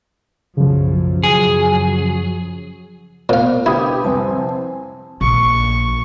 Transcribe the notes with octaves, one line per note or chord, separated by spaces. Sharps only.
B1 F#2 C#3 F3
F#2 F#3 G#4
A#2 B3 C5 F5
D3 E4 G4 B4 D#6 G#6
C2 F2 C4 C5 G#5 A5
A#1 C#6